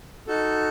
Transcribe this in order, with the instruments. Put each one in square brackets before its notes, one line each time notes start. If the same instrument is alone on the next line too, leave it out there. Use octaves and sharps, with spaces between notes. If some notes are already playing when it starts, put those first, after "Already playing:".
[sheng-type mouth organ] D#4 F#4 A4